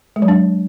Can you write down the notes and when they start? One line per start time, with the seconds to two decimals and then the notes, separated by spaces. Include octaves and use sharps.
0.16 G#3
0.22 F#3
0.28 D4